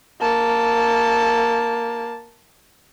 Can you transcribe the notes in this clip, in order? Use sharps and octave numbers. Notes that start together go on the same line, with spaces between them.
A#3 A5